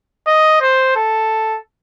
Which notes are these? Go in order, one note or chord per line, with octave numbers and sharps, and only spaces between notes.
D#5
C5
A4